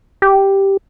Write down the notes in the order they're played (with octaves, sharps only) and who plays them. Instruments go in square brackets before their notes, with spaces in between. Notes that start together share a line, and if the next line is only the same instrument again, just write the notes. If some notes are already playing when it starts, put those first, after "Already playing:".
[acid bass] G4